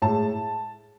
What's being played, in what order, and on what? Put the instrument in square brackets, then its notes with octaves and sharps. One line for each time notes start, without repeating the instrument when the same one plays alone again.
[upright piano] A2 G#3 A5